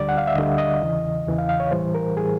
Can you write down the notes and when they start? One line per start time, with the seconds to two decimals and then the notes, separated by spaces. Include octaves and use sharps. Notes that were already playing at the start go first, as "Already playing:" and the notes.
Already playing: D2 D3 G3 D5
0.09 F#5
0.18 F5
0.27 E5
0.35 D2 D3 G3 D#5
0.58 D#5
0.82 E2 C#3 E3
1.27 E2 C#3 E3
1.38 F5
1.49 F5
1.60 C#5
1.71 A2 E3 G3 C5
1.95 A#4
2.16 A2 E3 G3 G#4